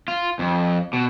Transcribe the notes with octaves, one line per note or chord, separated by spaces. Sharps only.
F4
F2
B2